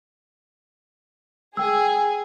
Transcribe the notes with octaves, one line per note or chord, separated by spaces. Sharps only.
G#4 G5 E6